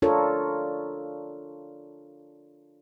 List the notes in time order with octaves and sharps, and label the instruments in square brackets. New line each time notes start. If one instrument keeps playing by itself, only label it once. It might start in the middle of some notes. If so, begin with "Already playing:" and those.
[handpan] D4 F4 A4 A#4 C#5